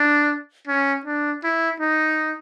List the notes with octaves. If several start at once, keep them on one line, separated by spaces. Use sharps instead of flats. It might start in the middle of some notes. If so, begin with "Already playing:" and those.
Already playing: D4
C#4
D4
E4
D#4